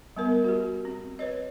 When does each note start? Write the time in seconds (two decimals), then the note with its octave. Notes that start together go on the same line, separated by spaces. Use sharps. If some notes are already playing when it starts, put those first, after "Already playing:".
0.16 G3 B3 A#4
0.44 F#4 G4
0.85 C4
1.19 B4 C#5 D#5